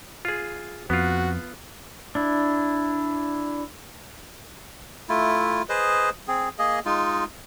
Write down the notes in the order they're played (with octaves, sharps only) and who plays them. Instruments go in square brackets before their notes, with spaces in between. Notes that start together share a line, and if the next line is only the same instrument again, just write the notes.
[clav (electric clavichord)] F4 G#4
[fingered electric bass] F2 [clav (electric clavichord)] B3 F4 [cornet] F#4
[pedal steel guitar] D4 E4
[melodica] A3 E4 F4
G#4 B4 C5 D#5
C4 G#4
A#3 G#4 D#5
G#3 D#4 F4